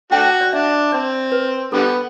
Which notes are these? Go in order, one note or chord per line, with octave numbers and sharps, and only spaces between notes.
A3 D4 F#4 G5
D5
D4 E5
C4 D5
B4
D3 G3 B3 A4